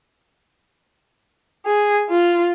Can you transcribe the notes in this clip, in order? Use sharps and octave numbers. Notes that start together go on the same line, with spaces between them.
G#4
F4